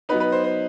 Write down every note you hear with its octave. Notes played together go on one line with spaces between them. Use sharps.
F#3 B3 D#4 B4
B4
C5
C5